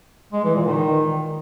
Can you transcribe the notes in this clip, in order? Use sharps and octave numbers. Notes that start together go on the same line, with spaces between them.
G#3
E3
A#2
D#3